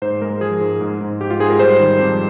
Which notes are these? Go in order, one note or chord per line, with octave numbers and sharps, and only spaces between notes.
G#2 C5
G#3 A#4
F3 G#4
G#2
G#2
G#2
G#2 G4
F4
G#2 G#4
A#4
G3 C5
D#3
F2